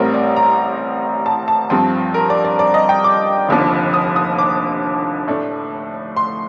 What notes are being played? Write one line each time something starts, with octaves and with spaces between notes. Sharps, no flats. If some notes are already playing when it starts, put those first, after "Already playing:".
Already playing: A1 A2 G3 C4 A#4
D5
A#5
A5
A5
G2 F3 C4
A#4
D5
D5
D5
D#5
G5
D6
F1 D#2 D3 F3
D#6
D#6
D6
A2 A3 D4
C6